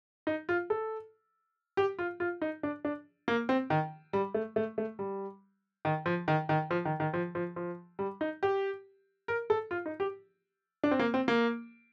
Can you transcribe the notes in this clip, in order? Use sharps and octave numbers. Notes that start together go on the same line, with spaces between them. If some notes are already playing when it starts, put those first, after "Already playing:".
D#4
F4
A4
G4
F4
F4
D#4
D4
D4
A#3
C4
D#3
G3
A3
A3
A3
G3
D#3
F3
D#3
D#3
F3
D#3
D#3
F3
F3
F3
G3
D#4
G4
A#4
A4
F4
D#4
G4
D4
C4
A#3
C4
A#3